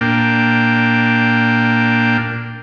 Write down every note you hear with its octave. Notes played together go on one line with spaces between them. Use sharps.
A#2 A#3 D4 G5